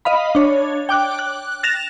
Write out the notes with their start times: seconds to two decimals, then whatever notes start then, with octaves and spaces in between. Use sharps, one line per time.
0.05 D#5 F5 B5
0.35 D4 C#5
0.89 G5 D6 F#6
1.19 F#6
1.63 F#6 A6 A#6 E7 F7